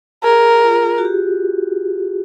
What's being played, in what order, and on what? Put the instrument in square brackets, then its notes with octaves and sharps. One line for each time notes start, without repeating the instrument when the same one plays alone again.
[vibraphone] G#4 [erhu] A#4
[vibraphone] F4
F#4
G4